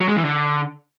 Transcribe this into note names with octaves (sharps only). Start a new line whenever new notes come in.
F#3
G#3
E3
D3